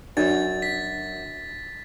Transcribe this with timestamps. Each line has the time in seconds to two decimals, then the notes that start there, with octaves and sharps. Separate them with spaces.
0.17 F#2 D4 D5 F#5 A6
0.62 B6